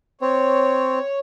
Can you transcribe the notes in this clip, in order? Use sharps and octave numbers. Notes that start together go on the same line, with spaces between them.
C4 C#5